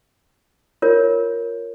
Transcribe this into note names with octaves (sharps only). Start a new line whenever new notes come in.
F4 A#4 C#5